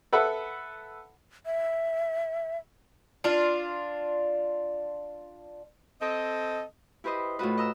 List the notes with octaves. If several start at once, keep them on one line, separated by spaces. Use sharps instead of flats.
A4 B4 E5 F#5 B5
E5
D4 F4
C4 A4 D#5
E4 G4 B4 C5 D#5
A2 F4 F#4 B4
D#5 A#5 E6